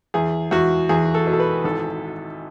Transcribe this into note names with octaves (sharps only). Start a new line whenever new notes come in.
E2 G#4
E2 F#4
E2 G#4
A4
B2
A4
B4
G#1 A4